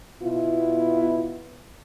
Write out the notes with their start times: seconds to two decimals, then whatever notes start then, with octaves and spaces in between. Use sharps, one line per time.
0.23 B2 B3 E4 F4